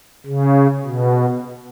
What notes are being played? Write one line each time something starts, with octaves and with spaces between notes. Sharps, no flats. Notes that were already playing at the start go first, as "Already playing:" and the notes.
C#3
B2